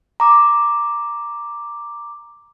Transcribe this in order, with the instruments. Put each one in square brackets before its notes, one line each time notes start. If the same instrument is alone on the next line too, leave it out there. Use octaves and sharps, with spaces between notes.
[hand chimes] A#5 D6